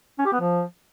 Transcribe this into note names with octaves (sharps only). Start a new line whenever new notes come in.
C#4
G4
B3
F3